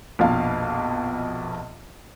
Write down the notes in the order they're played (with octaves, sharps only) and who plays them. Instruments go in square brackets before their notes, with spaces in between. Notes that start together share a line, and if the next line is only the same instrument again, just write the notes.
[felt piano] A#1 F2 B2 F5